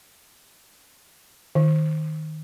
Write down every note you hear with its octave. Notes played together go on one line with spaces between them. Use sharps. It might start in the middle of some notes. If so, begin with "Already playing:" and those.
D#3